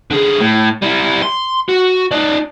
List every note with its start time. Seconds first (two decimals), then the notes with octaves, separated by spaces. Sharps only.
0.11 D3 G#4
0.40 A2
0.82 G3 E4
1.22 C6
1.69 F#4
2.11 D#4 D5